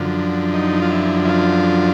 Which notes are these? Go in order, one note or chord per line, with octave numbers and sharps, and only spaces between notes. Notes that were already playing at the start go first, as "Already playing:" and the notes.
Already playing: F#2 D3 F3
D#4
F4
E4
E4
F4